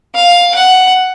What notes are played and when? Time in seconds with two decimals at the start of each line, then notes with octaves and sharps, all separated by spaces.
0.16 F5
0.55 F#5